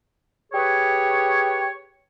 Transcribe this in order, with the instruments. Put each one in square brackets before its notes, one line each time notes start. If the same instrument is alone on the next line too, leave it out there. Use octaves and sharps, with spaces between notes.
[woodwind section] G4 G#4 B4 C#5